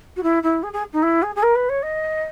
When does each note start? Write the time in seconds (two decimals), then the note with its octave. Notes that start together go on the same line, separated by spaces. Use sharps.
0.16 F#4
0.23 E4
0.43 E4
0.63 G#4
0.73 G#4
0.93 D#4
1.02 E4
1.22 G#4
1.36 G#4
1.43 A#4
1.55 B4
1.69 C#5
1.82 D#5